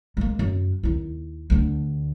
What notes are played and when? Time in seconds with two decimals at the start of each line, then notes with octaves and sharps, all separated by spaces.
0.17 G#3 A#3
0.39 F#2
0.83 D#2 E4
1.50 D2 D4